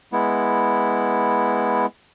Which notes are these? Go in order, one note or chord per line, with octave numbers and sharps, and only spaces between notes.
G#3 B3 E4